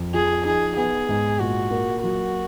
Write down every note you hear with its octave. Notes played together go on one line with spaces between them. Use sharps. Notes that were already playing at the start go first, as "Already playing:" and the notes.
Already playing: F2
F3 G#4
D#4 G#4
B3 G#4
G#2
A#2 F#4
A#3
F#3 F#4